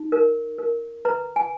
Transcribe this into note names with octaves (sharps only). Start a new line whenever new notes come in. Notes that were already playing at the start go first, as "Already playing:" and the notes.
Already playing: D#4
A#4
A#4
B4 A#5
G#5